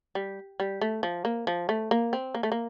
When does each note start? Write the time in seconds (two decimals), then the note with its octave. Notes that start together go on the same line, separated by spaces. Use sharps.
0.15 G3
0.60 G3
0.81 A3
1.03 F3
1.25 A#3
1.47 F3
1.69 A3
1.91 A#3
2.13 C4
2.35 A#3
2.43 A3
2.52 A#3